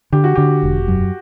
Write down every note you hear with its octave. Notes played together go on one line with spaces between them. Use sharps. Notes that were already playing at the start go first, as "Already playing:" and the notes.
D3 G4
F#4
D3 G4
E1
F#2